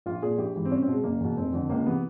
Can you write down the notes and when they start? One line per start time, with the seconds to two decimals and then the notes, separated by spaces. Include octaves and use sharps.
0.06 A#1 F4
0.22 A#2 G#4
0.38 A#1 G4
0.55 G#2 E3
0.65 C4
0.71 C2 C#4
0.82 C4
0.87 B2
0.93 G#3
1.04 F#1 A#3
1.20 E2 B2
1.37 F1 C4
1.53 F2 D3
1.69 C#2 A#3
1.86 C3 E3 B3